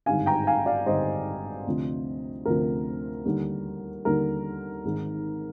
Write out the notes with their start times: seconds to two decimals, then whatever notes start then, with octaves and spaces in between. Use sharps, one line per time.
0.06 G#1 G2 D3 F5 G#5
0.26 G5 A#5
0.47 F5 G#5
0.66 D5 F5
0.86 G#1 G2 D3 C5 D#5
1.67 D2 C3 F3
2.45 D2 C3 F3 A#4
3.25 D#2 D3 G3
4.05 D#2 D3 G3 A#4
4.85 G#1 G#2 D#3